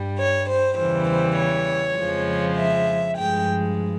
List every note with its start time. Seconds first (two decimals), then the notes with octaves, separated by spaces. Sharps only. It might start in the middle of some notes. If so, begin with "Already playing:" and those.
Already playing: G2 G3
0.20 C#5
0.49 C5
0.78 E2 C#3 E3 G3 C5
1.09 C5
1.38 C#5
1.98 F2 C#3 F3 G#3
2.57 E5
3.17 G2 F3 G#3 G5